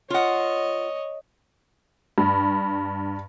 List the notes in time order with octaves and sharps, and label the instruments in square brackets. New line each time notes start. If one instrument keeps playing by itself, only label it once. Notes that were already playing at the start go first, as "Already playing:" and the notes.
[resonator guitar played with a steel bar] F4 F#5 [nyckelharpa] C#5 D#5
[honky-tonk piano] G2